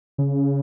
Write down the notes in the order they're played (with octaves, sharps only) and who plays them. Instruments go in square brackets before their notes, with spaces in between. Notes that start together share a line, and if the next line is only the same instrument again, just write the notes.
[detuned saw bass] C#3